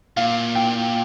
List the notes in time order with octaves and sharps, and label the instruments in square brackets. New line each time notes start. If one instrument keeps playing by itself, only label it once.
[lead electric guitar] A#2 [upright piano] F5
[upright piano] G5